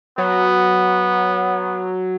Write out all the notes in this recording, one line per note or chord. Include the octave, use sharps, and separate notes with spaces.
F#3 B3